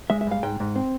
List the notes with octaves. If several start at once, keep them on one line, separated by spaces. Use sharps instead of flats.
G#3 E5
E5
G2 F5
G#2 G5
G#2
C4